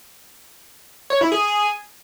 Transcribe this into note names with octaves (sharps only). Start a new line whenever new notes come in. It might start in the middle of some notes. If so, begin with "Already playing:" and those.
C#5
E4
G#4